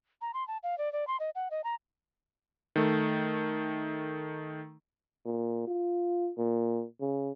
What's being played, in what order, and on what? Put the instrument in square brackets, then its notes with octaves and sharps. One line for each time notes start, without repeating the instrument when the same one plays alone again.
[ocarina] A#5
C6
A5
F5
D5
D5
C6
D#5
F#5
D#5
A#5
[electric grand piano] D#3 A3
[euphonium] A#2
F4
A#2
C#3